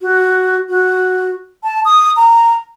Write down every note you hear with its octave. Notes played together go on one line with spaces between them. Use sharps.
F#4
F#4
A5
D#6
A#5